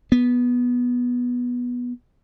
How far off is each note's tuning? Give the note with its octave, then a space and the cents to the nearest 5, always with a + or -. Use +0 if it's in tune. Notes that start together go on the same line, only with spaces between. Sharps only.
B3 -10